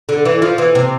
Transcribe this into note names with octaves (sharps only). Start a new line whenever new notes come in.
D3
E3
F3
E3
C3